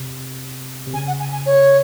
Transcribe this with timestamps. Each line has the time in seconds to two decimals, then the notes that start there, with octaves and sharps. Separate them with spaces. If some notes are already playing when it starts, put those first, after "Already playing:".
Already playing: C3
0.87 C3
0.94 C#3 G#5
1.07 F#5
1.20 G#5
1.33 G#5
1.46 C#5